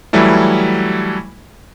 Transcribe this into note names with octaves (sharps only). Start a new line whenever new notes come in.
E3 F#3 G3 A3 E4